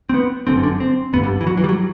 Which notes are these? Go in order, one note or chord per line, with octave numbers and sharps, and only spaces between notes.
C4
B3
G1 F#2 D3 C4
D4
C4
G1 G2 D3 B3
G3
E3
F#3
E3
G3
F#3